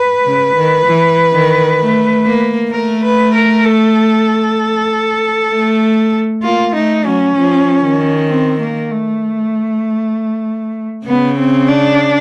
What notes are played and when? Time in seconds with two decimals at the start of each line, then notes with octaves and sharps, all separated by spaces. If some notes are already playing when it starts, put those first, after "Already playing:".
Already playing: B4
0.25 C#3
0.56 D#3
0.86 E3
1.33 D#3
1.80 A3
2.26 A#3
2.72 A3 A#4
3.03 B4
3.34 A#4
3.65 A4
5.51 A3
6.43 A#3 F4
6.74 A3 D#4
7.05 F#3 C#4
7.36 F3
7.83 D#3
8.29 C4
8.60 A#3
8.91 A3
11.07 C#3 B3
11.38 C4
11.69 D4